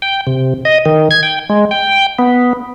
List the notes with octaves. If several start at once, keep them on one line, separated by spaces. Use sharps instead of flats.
G5
C3
D#5
D#3
G#6
G5
G#3
G5
B3